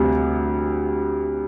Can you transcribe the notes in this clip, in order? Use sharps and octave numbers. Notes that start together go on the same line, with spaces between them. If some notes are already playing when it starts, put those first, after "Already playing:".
Already playing: D2 C3 G3